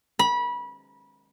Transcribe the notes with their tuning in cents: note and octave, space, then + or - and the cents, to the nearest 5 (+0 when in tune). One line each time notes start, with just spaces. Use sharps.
B5 -25